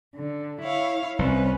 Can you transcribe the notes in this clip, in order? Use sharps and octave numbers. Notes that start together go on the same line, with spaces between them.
D3
E4 C#5 F5
C2 C#4 B4